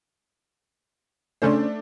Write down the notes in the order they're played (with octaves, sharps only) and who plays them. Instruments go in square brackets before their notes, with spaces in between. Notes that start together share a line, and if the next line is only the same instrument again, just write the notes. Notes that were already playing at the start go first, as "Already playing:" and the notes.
[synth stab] C#3 C#4 C5 [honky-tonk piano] A3 D4